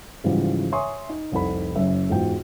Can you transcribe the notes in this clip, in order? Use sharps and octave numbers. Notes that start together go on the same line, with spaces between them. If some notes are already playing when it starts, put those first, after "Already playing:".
G#2 C#3 E3 F3 G3
C#5 E5 G#5 C6 C#6 D#6
D#4
F1 C2 C4 D#4 A4 B5
F#1 F#2 E5
E2 G#2 F4 F#4 G5